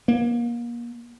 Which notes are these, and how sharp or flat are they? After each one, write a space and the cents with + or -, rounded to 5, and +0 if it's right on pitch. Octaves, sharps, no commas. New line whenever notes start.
A#3 +30